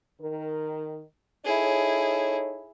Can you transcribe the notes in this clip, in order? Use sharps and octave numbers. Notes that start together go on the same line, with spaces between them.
D#3 A#4
D#4 E4 G#4 A4 C#5